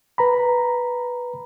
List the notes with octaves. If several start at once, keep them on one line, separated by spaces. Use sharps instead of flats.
B4 A#5 B5